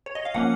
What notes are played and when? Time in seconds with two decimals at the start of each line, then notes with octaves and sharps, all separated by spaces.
0.06 C#5
0.15 D#5
0.25 F5
0.34 F3 A#3 C#4 F#5